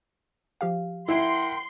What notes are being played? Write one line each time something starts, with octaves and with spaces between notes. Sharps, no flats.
F3 G4 F5
E4 A#4 F#5 G5 C6